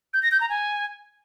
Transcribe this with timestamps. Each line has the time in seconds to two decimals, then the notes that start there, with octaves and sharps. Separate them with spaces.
0.14 G6
0.23 A#6
0.31 G6
0.40 A#5
0.49 G#5